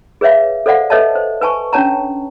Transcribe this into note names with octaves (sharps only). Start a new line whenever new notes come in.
G#4 B4 C#5 E5 F5
A4 C5 D5 F5 F#5
A4 B4 C#5 D#5 E5 A5
C5
B4 G#5 A5 C#6
C#4 D4 C#5 A5 A#5